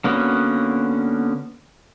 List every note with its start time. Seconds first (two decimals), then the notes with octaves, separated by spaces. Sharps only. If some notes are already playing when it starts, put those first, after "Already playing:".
0.04 D3 A#3 B3 C#4 F#4